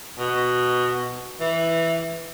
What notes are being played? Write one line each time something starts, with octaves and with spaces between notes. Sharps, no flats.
B2
E3